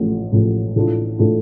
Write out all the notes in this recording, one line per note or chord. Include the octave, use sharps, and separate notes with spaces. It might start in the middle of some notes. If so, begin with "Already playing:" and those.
Already playing: A1 A2 F3
A1 A2 F3
A2 E3 A3 D4 F4
A2 E3 A3 D4 F4